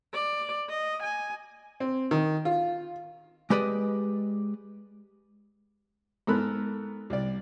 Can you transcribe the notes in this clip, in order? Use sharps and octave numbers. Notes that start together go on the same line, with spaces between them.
D5
D#5
G#5
C4
D#3
F4
G#3 G4 B4 D5 D#5
G#2 B3 A4 A#4 B5 F#6
C2 D5